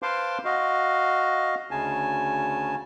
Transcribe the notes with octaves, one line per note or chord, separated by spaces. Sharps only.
B4 C5 F5 A5 C6 D6
F#4 D#5 F5
D2 C#3 G#5 A5